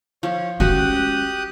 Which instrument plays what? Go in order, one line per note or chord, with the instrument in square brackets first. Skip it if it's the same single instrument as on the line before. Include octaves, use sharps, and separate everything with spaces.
[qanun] F3 [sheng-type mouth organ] C#5
[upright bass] G#3 C#4 [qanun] F#4 [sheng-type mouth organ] G4 D#6 F#6